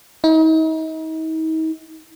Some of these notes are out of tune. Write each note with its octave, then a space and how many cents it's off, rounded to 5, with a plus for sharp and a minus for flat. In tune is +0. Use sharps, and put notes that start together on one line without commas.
D#4 +40